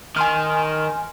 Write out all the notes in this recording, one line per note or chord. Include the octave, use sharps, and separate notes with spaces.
D#3 G#5 C6 F6